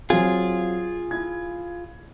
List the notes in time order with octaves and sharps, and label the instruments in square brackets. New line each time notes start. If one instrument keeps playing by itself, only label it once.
[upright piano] F#3 C4 [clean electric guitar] F4 G#4
[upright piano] E4 G#6